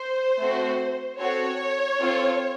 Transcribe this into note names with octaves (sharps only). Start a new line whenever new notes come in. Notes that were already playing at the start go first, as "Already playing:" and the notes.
Already playing: C5
A3 C4 F#4
C4 F#4 A4 C#5
C4 F4 A4